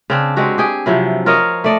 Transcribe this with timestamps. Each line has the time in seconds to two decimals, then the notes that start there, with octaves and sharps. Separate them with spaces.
0.10 C#3 C4 D4
0.36 G#3 C4 F#4 G4
0.58 G4 G#4 G5
0.86 C3 F3 F#3 E4
1.26 F4 A#4 C#5 D#5
1.64 A3 D5 D#5